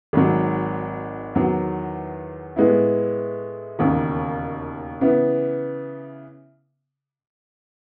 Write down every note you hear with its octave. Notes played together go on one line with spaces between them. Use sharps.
G#1 G#2 F#3
E2 D#3 F#3
A2 G#3 B3 E4
E1 D#2 C#3
C#3 E3 B3